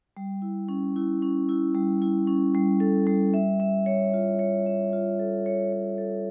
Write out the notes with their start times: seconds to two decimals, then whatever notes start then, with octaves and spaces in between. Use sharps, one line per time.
0.17 G3
0.42 E4
0.69 C#4
0.96 E4
1.22 C#4
1.49 E4
1.75 G3
2.02 E4
2.27 C#4
2.55 G3
2.80 A4
3.07 G3
3.34 E5
3.60 E5
3.86 C#5
4.14 F4
4.39 C#5
4.66 E5
4.93 F4
5.20 A4
5.46 C#5
5.72 C#5
5.98 A4